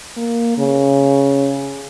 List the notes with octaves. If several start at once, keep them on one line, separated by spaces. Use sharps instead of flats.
A#3
C#3